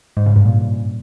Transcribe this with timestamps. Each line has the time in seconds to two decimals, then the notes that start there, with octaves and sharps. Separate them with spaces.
0.17 G#2
0.26 C#3
0.36 G2
0.46 A#2